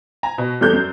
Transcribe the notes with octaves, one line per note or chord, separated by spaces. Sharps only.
G#5 A#5
B2
E2 G3 A3 A4 F#6 G6
F#2